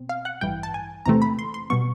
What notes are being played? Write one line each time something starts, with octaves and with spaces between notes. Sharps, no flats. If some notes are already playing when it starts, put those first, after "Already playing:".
Already playing: B2 C4
F5
F#5
A1 G2 E3 G5
A5
G#5
E2 C3 E3 A3 C4 A#5
B5
C6
C6
B2 G3 B3 C#6